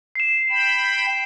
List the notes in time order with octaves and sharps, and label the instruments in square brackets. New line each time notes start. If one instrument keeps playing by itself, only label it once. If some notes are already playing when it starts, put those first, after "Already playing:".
[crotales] C7 E7
[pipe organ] G5 B5